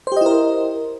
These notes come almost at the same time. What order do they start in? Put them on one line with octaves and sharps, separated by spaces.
C5 G4 D#5 E4 A#4